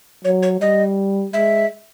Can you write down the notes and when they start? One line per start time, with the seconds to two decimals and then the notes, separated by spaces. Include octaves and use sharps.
0.24 F#3 C#5
0.42 C#5
0.61 G3 D#5
1.33 G#3 E5